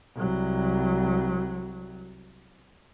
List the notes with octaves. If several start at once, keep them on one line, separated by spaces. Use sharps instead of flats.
C2 F#3